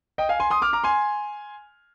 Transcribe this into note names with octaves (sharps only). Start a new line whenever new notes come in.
D#5 G5
F5 G#5
G#5 C6
C6 D#6
D6 F6
A#5 D6
G#5 C6